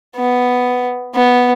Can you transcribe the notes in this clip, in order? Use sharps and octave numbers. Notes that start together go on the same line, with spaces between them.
B3
B3